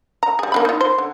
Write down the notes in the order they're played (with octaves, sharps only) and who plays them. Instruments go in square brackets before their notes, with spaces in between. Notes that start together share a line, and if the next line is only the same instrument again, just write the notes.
[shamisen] A#5
G3 G#4
A#3 D4 B5
D#4 F4
C5
D3